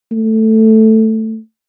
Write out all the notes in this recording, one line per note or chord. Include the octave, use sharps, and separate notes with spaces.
A3